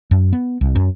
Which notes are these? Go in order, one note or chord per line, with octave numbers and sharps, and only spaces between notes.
F#2
B3
C2
F#2